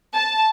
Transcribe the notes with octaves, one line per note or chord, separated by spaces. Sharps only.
A5